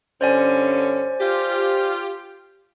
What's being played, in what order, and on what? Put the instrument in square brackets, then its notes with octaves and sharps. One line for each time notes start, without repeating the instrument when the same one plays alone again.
[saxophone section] G2 D3 C#4 [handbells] C5 D5 G#5
[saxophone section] F4 G4